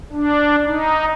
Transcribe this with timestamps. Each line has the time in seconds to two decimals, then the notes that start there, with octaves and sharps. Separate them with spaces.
0.13 D4
0.66 D#4